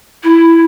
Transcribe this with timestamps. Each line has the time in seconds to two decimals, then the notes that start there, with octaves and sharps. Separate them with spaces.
0.23 E4